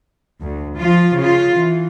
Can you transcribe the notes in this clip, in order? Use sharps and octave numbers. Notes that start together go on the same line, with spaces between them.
D2
F3 F4
C#3 F4
E3